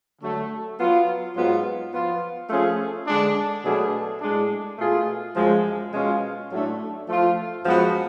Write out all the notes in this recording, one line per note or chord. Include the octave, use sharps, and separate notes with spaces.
D3 F#3 A3
F#3 B3 F4
G#2 F#3 B3 F4
F3 B3 F4
F3 A3 C#4 F4 G#4
D3 G#3 D4
B2 F#3 A3 D4 G#4
A2 G#3 D4
B2 A3 F4 G#4
F#2 F3 G#3
B2 G#3 C#4 F4
A2 F#3 A3 D4
F3 A3 F4
F#2 F3 G#3 B3 F#4